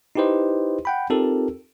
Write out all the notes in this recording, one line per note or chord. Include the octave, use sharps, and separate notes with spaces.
D#4 E4 G4 B4 C5 D#5
F#5 G5 B5
C4 D#4 F4 G4 A4 A#4